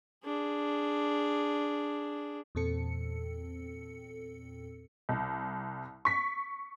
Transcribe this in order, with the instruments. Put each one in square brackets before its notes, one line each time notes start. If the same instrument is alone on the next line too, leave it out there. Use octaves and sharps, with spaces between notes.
[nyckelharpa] D4 G#4
[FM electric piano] E2 A#2 C4 A4 C#7
[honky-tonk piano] C2
C#6 B6